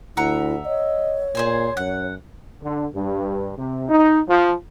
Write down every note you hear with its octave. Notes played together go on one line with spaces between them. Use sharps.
D2 E4 E5 F#5 A#5
C#5 D#5
A#2 G#4 C5 G#5
F#2 F#5
D3
G2
C3
D#4
F3